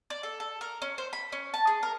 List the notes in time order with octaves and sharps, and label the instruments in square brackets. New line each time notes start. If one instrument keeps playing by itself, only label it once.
[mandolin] D5
A4
A4
A#4
C#4
C5
B5
C#4
A5
G#4
A#4